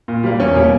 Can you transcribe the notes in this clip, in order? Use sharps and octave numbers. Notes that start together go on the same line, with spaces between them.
A#2
G3 A#3
E2 C#4
B2 G3 A#3